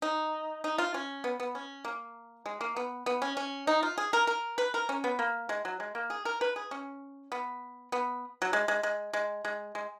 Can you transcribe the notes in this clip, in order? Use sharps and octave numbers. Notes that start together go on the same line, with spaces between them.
D#4
D#4
F4
C#4
B3
B3
C#4
A#3
G#3
A#3
B3
B3
C#4
C#4
D#4
F4
G#4
A#4
A#4
B4
A#4
C#4
B3
A#3
G#3
F#3
G#3
A#3
G#4
A#4
B4
G#4
C#4
B3
B3
F#3
G#3
G#3
G#3
G#3
G#3
G#3